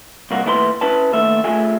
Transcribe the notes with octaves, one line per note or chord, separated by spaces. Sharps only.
C2 A#3 F#4
D#2 A2 E4 A4 B4 C6
C#4 E4 B4 A5
D#2 A3 E5
A3 F4 G#4 E5 G#5